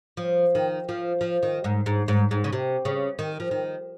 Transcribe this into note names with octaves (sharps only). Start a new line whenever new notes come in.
F3
D#3
F3
F3
D#3
G#2
G#2
G#2
G#2
C#3
C3
C#3
D#3
F3
D#3